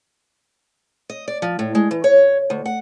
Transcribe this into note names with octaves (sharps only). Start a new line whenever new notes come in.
D#5
D5
F3
A2
G#3
E3
C#5
D2
F#5